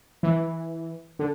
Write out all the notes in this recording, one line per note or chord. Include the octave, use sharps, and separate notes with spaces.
E3
D3